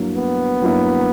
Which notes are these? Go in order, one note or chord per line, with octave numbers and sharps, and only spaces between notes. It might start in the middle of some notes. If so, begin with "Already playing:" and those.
Already playing: G2 F#3 A#3 E4
B3
G2 F#3 A#3 E4